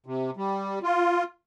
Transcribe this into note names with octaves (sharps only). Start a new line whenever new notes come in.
C3
G3
F4